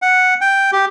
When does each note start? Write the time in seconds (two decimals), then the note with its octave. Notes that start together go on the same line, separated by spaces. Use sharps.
0.02 F#5
0.41 G5
0.72 G4